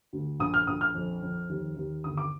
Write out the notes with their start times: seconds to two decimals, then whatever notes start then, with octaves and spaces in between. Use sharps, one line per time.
0.13 D2
0.40 A#1 D#6
0.54 F6
0.67 A#1 D#6
0.81 F6
0.95 F2
1.22 F2
1.49 D#2
1.76 D#2
2.04 G1 D#6
2.17 D6